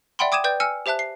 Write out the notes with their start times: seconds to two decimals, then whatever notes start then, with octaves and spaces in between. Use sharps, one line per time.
0.19 D5 E5 F#5 G5 B5 C6
0.32 G5 D6 D#6 G#6 D#7 E7
0.44 B4 D5 G5 G6
0.60 G#5 E6 F6 C#7
0.86 G4 C5 E5 A5 F#6
0.99 C7